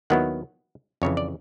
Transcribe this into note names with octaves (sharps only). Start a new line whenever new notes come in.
D#2 D#3 F#3 B3 E4 F#5
F2 C#3 E3 C#5
D5